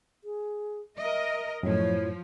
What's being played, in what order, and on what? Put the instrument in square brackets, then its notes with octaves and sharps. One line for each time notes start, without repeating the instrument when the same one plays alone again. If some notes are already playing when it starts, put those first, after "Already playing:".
[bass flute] G#4
[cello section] A#4 D#5 [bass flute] E5
[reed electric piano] F#2 A2 [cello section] F3 [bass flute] E4 [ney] C#5